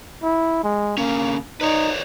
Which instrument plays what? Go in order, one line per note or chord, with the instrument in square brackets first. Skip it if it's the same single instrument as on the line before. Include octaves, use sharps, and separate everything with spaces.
[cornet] E4
G#3
[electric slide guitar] D3 C#4 [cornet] A#3
[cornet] D#4 [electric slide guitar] B4 C#5 D5